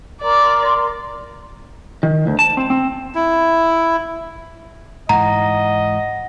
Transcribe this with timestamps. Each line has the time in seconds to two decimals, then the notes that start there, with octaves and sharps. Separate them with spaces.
0.22 A#4 D5 A#5 C6
2.03 D#3
2.27 D2
2.39 A5
2.57 C4
2.70 C4
3.15 E4
5.09 G#2 E3 D#5 F#5 A#5